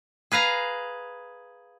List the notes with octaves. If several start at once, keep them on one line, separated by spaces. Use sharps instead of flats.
G#4 B4 F5 A#5